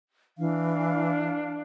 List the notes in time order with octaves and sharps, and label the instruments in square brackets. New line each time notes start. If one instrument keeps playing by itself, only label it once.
[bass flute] E3 [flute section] D4 F5